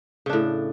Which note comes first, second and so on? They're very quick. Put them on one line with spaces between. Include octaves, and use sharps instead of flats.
C#3 D4 A2